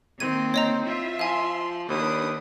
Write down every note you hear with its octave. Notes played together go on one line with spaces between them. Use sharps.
D#3 A#3 C4 G#6 D#7
C#5 D#5 A#5
F4 E5
F3 F5 G#5 C6
D#2 D4 B4 D#6